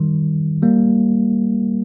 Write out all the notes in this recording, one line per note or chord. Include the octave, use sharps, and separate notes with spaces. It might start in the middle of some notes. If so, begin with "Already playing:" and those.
Already playing: D#3 G3
G3 A#3